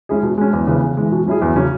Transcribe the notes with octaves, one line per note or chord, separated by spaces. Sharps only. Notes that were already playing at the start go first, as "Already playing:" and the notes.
G#3 C#4 E4 G#4
B2
G#3 C#4
E2
C#3 E3 B3
C#3
E3 G#3
B2
F#3 C#4 E4 G#4
E2
C#3 F#3 C#4